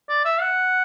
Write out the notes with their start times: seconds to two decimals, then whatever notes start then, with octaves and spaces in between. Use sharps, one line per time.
0.09 D5
0.25 E5
0.41 F#5